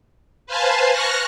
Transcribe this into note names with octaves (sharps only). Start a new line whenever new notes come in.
B4 C5 F5 G#5 A5
C#6 F6 F#6 A#6